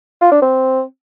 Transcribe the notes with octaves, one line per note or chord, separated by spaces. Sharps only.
F4
D4
C4